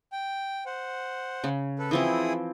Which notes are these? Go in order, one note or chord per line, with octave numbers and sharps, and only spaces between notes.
G5
C5 F#5
C#3
A4 B4
E3 F3 C4 E4 G#4 D#6